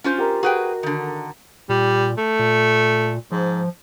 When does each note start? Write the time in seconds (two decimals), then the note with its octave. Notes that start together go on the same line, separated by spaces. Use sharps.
0.04 C#4 F4 C5
0.18 G4 A#4 D#5
0.43 F#4 G#4 B4 G5
0.83 D3 D#3
1.69 A#2 G3
2.18 A3
2.39 A#2
3.32 G#2 F3